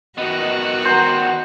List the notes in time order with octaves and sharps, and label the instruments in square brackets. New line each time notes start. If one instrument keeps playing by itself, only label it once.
[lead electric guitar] D#3 B3 [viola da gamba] F#4 [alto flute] D#5
[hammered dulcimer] C5 A#5 [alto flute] F#5